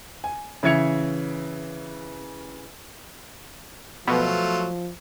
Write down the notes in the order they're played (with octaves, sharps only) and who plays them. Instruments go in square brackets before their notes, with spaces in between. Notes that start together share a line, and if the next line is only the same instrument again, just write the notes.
[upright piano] G#5
C#3 E3 E5 G#6 C#7 F7
[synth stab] B2 B3 [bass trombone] F3 [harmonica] F#3 A3 F4